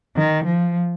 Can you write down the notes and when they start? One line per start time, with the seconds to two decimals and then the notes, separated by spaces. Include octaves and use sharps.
0.17 D#3
0.45 F3